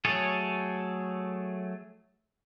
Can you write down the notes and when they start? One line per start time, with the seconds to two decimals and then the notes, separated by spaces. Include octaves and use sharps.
0.05 F#3 A3 G#4 A4 C#5